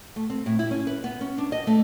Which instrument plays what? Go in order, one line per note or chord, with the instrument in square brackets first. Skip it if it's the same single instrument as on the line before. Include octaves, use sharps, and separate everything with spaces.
[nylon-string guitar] A3
C4
A2
E4
C#4
B4
B3
C#4
D4
D#5
A3